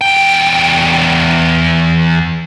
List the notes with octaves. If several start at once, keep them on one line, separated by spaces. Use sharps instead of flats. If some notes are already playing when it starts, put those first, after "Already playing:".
E2 G5